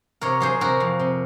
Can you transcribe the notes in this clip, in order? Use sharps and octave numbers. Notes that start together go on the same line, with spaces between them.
C3 A#4 C#5
F#3 G#4 C5
C3 F#4 A#4
F2
C3